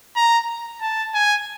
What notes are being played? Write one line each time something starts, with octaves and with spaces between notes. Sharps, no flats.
A#5
A5
G#5